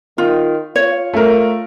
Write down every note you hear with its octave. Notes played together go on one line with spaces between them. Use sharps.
D#3 F4
F4 C#5
A3 A#4